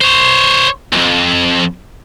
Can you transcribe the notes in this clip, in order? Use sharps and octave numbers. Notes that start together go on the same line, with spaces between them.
C5 C#5
B1 F2